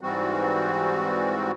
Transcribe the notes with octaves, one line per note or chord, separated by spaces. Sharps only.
G#2 E3 G3 C4 F#4